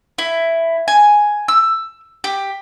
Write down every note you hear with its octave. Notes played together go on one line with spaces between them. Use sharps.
E4
G#5
E6
G4